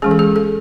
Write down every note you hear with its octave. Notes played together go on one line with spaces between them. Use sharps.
E3 G#3 C#4 G#4
A4
G#4
A4